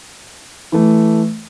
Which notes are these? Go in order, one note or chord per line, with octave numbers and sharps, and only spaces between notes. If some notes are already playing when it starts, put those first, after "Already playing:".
E3 A3